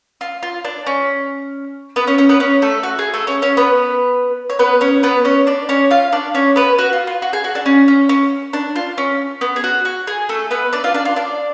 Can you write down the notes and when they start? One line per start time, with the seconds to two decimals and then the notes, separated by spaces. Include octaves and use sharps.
0.21 F4
0.43 F4
0.65 D4
0.87 C#4
1.96 B3 B4
2.07 C#4 C#5
2.18 C#4 C#5
2.29 B3 B4
2.40 C#4 C#5
2.62 A3 A4
2.83 F#4
2.99 G#4
3.14 A3 A4
3.27 C#4 C#5
3.42 C#4 C#5
3.57 B3 B4
4.50 C#5
4.59 B3 B4
4.81 C#4 C#5
5.03 B3 B4
5.25 C#4 C#5
5.47 D4 D5
5.69 C#4 C#5
5.91 F4 F5
6.13 D4 D5
6.35 C#4 C#5
6.56 B3 B4
6.79 F#4
6.93 F4
7.07 F4
7.22 F#4
7.33 G#4
7.44 F#4
7.55 D4
7.66 C#4
7.88 C#4
8.09 C#4
8.53 D4
8.76 F4
8.98 C#4
9.41 B3
9.56 G#4
9.64 F#4
9.85 F#4
10.07 G#4
10.29 A3 A4
10.51 B3 B4
10.73 D4 D5
10.84 F4 F5
10.94 D4 D5
11.05 F4
11.16 D4 D5